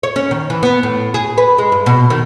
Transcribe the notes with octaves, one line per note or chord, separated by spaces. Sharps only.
C#5
C#4
D#3
E3
B3
A2
G#4
B4
G#3
G2
B2
D#3